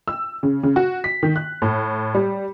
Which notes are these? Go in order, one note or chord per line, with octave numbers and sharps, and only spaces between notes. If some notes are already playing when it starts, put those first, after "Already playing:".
E6
C#3
C#3
F#4
B6
D#3
F#6
A2
G3